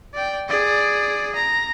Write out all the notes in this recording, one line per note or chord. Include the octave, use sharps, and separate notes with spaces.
D5 G5
G#4 D5
A#5